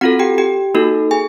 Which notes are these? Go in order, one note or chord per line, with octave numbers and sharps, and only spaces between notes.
C4 F4 F#4 A4 F#5
G4 G5
G4 G5
A#3 D#4 F#4 A4
G#4 G#5